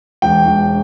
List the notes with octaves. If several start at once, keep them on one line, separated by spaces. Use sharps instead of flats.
E1 G5
E1